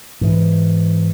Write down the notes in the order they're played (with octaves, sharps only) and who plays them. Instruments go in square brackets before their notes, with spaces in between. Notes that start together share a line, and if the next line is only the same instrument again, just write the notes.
[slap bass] G#2 E3